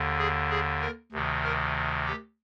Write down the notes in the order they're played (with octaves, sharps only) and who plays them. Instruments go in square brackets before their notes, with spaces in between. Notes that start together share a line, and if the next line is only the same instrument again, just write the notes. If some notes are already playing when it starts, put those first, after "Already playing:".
Already playing: [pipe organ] D#2 D3
G#4
G#4
A#4
D2 C3 D#3
A#4
G4